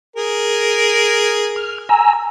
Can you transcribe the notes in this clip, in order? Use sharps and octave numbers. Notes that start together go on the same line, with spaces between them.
G#4 A#4
F6
G#5 A#5 E6